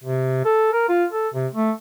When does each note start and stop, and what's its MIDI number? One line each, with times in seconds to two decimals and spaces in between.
0.04 0.42 48
0.45 0.72 69
0.73 0.86 70
0.89 1.05 65
1.12 1.28 69
1.34 1.47 48
1.54 1.71 57